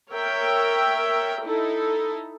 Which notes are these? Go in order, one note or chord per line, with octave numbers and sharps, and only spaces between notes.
A#4 C#5 E5 G5
D#4 E4 A4